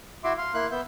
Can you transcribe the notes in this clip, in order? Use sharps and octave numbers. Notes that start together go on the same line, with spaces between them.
E4 F#4 E5 C6 D6
F5 C6
A#3 E4 C6 F#6
B3 E5 G6